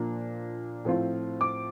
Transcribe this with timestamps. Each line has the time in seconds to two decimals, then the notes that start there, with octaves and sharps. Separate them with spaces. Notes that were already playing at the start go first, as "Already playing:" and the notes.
Already playing: A#2 F3 A#3 D4
0.85 A2 F3 C4 F4
1.41 D6